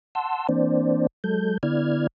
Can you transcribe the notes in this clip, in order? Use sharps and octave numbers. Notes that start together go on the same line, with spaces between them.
F#5 A5 C6 E6
E3 A#3 C4 D4 C5 D5
F#3 G#3 A4 G6
D3 B3 E4 D5 F6 G#6